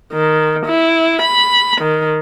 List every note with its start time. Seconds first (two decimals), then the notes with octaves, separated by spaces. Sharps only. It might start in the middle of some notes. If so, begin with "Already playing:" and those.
0.13 D#3
0.66 E4
1.22 B5
1.82 D#3